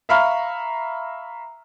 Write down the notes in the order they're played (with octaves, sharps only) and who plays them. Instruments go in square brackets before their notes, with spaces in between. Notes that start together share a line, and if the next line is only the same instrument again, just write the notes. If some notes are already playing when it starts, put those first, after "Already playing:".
[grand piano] E5 F5 A#5 B5 C#6 F6